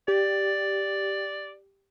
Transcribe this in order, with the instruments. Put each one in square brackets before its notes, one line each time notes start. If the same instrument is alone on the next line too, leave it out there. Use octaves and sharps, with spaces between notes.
[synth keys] G4 [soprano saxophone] D5